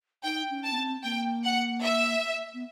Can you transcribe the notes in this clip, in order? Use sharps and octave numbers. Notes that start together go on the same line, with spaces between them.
D#4 G5
C#4
A5
B3
C4
A#3 G5
F#5
E5
B3